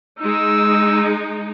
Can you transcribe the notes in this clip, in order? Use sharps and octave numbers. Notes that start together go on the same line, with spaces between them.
G#3 D#4 E6